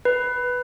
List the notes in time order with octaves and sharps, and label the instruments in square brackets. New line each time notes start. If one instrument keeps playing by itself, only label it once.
[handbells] B4